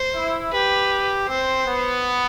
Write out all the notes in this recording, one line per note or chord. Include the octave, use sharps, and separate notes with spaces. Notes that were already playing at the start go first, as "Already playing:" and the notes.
Already playing: C5
E4
G4 B4
C4 C5
B3